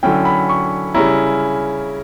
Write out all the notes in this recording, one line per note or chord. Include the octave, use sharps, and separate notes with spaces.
D3 F#3 C#4 E4 G5
B5
C#6
C#3 G3 C#4 E4 A#5